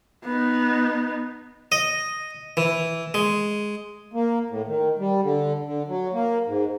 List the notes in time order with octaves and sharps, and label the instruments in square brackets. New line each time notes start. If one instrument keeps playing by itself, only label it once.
[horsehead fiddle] B3 D#4
[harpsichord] D#5
E3
G#3
[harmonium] A#3
A2
D#3
G3
D3
D3
F#3
A#3
G#2